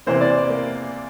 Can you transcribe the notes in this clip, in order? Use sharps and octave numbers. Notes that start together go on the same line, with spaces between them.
E2 C3 E3 A#3 C5
D5
A#3